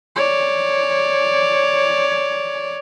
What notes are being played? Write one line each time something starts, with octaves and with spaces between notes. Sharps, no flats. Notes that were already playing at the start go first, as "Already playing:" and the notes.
C#5 D5